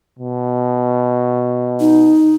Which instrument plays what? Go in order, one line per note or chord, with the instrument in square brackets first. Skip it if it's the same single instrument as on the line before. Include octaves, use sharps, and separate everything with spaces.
[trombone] B2
[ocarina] D#4